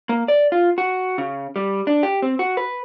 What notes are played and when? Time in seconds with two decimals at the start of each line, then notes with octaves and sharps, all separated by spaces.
0.09 A#3
0.28 D5
0.52 F4
0.78 F#4
1.18 C#3
1.56 G3
1.87 D4
2.03 G4
2.22 C4
2.39 F#4
2.57 B4